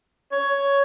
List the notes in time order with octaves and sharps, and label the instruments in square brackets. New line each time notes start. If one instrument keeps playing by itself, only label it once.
[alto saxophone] C#5